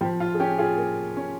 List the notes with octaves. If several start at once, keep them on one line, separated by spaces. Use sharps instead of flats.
F3 G4
F4
G#4
C#4 G4
F4 G#4
A#3
C#4